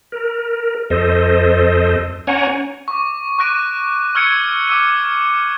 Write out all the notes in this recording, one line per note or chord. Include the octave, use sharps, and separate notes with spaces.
A#4
F2 A4 C5 D#5
C#4 C#5 F#5 G#5 A#5
C#6 D6
C#6 D6 F#6 A#6 D7 D#7
C#6 E6 F6 G#6 C#7 D7
D6 E6 D#7